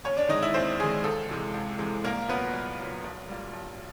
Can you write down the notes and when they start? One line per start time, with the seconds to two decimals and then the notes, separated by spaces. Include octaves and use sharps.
0.04 D#2 C#4 C#5
0.17 D4 D5
0.29 D#3 G#3 D#4 D#5
0.42 E4 E5
0.54 D#2 C4 C5
0.79 D#3 G#3 G#4
1.04 C#2 A4
1.29 C3 E3 G#3
1.54 C#2
1.79 C3 E3 G#3
2.04 C2 A#3 A#4
2.28 A#2 F#3 B3 B4
2.53 C2
2.78 F#3
2.83 A#2
3.04 B1
3.28 A#2 G3
3.53 B1